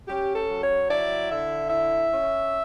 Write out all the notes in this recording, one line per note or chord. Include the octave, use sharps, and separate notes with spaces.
C#4 G4
A4
F#3
C#5
E4 D5
D3 E5
E4 E5
C#4